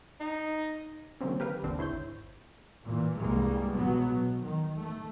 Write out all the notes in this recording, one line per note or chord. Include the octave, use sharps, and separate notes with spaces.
D#4
D3 D#3 F#3 A#3 C4 C#4
G4 A#4 B4 F5
G#1 D#2 D3 C4 D4
C#3 E4 C5 C#5 G6
G#1
A#2 E3
C2 G2 G3 G#3 A#3
B2 F#3 B3
B2
D#3
A3